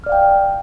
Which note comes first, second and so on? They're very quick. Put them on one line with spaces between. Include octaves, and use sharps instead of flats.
F6 D5 F5 G5